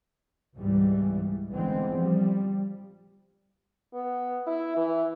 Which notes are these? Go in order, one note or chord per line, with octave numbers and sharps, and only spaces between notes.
C#2 G#2 B2 E3 G3
A1 D3 E3 G#3 B3 C4
F3 G3
B3
E4
E3